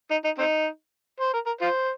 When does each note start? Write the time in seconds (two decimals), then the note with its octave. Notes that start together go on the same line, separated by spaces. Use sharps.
0.11 D#4
0.25 D#4
0.38 C4 D#4
1.20 C5
1.34 A#4
1.46 A#4
1.61 F4 C5